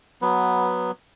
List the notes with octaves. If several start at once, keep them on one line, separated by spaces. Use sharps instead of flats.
F#3 B3 B4